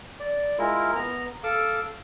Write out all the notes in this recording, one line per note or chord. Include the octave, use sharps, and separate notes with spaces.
D5
G#3 E4 F4 A#4
B3 A#5
A4 F5 D6 E6